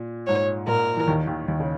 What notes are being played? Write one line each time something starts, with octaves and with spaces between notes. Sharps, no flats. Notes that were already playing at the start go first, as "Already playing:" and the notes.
Already playing: A#2
G#2 C#5
A#2 A#4
E3
D#2 D#3
D#2 D#3
D#2 D#3
C#3